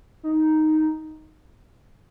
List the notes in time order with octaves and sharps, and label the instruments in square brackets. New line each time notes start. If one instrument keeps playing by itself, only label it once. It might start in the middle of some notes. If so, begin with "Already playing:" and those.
[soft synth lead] D#4